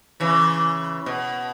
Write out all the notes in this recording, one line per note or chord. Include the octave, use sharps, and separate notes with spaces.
C#3 E3
B2